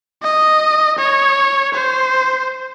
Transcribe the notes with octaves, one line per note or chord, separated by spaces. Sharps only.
D#5
C#5
C5